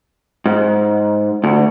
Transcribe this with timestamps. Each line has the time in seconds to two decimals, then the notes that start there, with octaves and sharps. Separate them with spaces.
0.46 G#2
1.44 D2